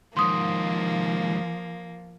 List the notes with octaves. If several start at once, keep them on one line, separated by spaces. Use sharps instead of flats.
D#2 G#2 F3 A#3 C6 D#6